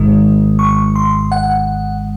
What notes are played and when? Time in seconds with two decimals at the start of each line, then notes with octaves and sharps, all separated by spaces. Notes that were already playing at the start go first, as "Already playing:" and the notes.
Already playing: G#1 G#2 D#3 G#3
0.59 C#6
0.95 C6
1.32 F#5